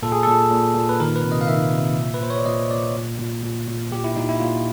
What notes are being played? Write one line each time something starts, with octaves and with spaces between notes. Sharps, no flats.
A#2 A4
G#4
A#2 A4
A#2
A#2
B4
D#3 A#4
B4
C3
D#5
F5
D#3 E5
C3
A#2
B4
A#2 C5
C#5
D5
A#2 D#5
A#2 D5
A#2
A#2
A#2
A#2
A#2 G4
E4
A#2 D#4
E4
A#2 F4